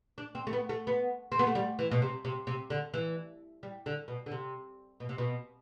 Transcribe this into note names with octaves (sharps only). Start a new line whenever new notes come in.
D4
C4
A3
B3
A3
B3
C4
B3
A3
G3
E3
B2
C3
C3
C3
D3
E3
G3
D3
B2
D3
C3
B2
C3
B2